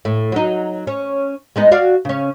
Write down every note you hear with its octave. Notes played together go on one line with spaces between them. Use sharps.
A2
F#3 D#4
C#4 C#5
G#3 B3 D#4
F#4 D5 F5
C#3 C#4